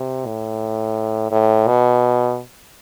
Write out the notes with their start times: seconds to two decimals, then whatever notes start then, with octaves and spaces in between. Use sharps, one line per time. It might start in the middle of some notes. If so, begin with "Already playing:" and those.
Already playing: C3
0.26 A2
1.31 A2
1.67 B2